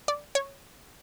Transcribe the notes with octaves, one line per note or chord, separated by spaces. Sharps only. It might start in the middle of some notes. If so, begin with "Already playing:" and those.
D5
C#5